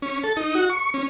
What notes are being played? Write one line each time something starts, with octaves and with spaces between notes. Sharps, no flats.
C#4
A4
D#4
F#4
C#6
C#4